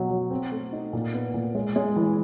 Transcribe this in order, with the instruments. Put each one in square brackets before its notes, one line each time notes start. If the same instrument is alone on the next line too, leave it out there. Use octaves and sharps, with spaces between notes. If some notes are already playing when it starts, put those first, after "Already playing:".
Already playing: [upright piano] B2 F#3
F#3
C4
A3
D#4
A#2
B3
A#2
G#3
G#3
E3